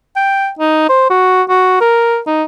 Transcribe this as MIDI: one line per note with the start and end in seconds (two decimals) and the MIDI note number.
0.16 0.50 79
0.59 0.84 63
0.89 1.06 72
1.10 1.43 66
1.49 1.78 66
1.81 2.19 70
2.27 2.44 63